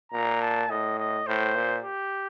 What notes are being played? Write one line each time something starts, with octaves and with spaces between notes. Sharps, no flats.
A#2 A#5
A5
A2 D#5
D#5
A2 C5
A#2
G4